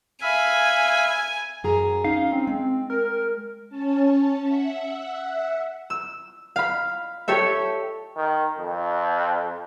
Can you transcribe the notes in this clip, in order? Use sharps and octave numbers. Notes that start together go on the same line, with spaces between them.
E5 F5 G#5 B5
F#2 G#4 A#5
C#4 D#4 F5
C4
G#3
A#4
C#4 A5
E5 F#5
E6
F5 B5
G4 A4 C#5 E5
D#3
F2